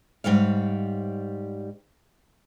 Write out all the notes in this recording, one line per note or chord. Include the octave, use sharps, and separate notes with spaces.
G#2 G3 C#5 F5